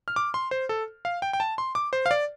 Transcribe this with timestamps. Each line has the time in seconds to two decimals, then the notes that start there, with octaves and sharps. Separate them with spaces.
0.08 F6
0.16 D6
0.34 C6
0.51 C5
0.69 A4
1.05 F5
1.22 G5
1.33 G5
1.40 A5
1.58 C6
1.75 D6
1.93 C5
2.06 F5
2.11 D5